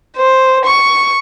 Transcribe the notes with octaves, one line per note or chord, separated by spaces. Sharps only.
C5
C#6